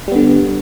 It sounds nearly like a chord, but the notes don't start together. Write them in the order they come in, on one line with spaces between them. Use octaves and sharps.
G3 B3 D3